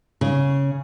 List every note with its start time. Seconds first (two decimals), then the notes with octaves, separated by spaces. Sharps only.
0.21 C#3